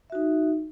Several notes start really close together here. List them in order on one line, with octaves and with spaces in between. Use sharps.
E5 F#4 D#4